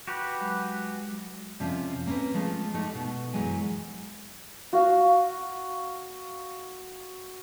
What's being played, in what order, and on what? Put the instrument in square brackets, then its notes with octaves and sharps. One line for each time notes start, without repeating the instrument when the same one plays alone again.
[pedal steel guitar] F#4 G4 B4
[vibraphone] F#3 G#3
[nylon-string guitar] F2 C3 F3 C#4 F4
A#3 C4 C#4 A4 B4
F3 G#3 A3
A3 D#4 G4
B2
F#2 E3 F#3 G#3 G#5
[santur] F#4 F5